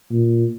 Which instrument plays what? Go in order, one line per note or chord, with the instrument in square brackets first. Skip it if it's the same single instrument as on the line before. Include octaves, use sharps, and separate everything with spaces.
[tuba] A#2